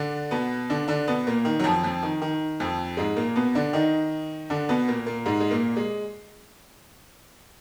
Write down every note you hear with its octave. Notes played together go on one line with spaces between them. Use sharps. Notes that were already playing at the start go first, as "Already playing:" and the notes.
Already playing: D3 D4
B2 B3
D3 D4
D3 D4
B2 B3
A#2 A#3
D#3
F#3
F2 F3
F2 F3
D#3
D#3
F2 F3
G#2 G#3
A#2 A#3
B2 B3
D3 D4
D#3 D#4
D3 D4
B2 B3
A#2 A#3
A#2 A#3
G#2 G#3
G#3
A#2 A#3
G#3